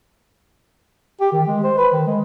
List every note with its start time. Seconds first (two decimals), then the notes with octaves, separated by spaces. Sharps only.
1.21 G4
1.32 D#3
1.47 G#3
1.64 C5
1.78 B4
1.92 D#3
2.07 G#3